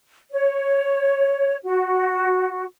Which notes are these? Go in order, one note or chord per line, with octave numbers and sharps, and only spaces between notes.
C#5
F#4